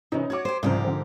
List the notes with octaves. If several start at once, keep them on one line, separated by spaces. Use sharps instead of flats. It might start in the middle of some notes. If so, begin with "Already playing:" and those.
C3 E3 C#4 D#4
F#4 C#5 D6 G#6
G4 C5
C2 G#2 C#3 F3 G4 A#4
D3 F3 C4